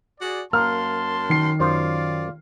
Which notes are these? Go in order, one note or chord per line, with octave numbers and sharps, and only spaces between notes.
F#4 G#4 D5
F#2 A#3 A5 C6 F6
D#3 C7
F#2 F4 C5 D5